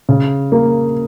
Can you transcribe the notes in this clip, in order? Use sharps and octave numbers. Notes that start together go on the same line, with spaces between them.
C#3
A#3